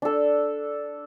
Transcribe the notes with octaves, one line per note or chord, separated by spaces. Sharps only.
D4 A4